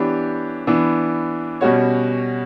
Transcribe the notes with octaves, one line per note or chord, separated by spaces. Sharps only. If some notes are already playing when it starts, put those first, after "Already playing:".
Already playing: E3 B3 D4 G4 C#5
E3 B3 D4
B2 G3 C#4 F#4 C#5